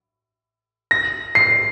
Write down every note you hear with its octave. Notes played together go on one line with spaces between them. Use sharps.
A#6
C7